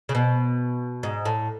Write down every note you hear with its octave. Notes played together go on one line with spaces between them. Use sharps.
C#3
B2
G#2
A2